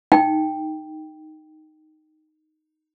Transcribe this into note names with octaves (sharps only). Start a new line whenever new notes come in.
D#4 G5